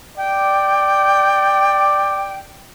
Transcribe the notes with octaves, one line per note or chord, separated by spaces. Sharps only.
D5 G5